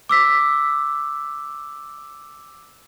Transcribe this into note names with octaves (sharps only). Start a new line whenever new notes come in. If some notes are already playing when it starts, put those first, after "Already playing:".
D6 E6 B6